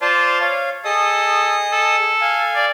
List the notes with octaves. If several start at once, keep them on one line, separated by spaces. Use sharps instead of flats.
F4 C5 D5 A5
C#5 F5
G#4 A4 D#5 D#6
A4
F5 G#5
D5